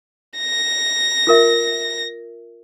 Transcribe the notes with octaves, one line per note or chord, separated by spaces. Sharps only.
A#6
F4 A#4 E5